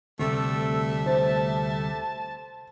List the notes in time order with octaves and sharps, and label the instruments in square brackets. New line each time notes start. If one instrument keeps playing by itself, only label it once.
[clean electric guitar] D2 C3 G3 [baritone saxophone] A3 [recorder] A4
[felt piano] C5 [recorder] A5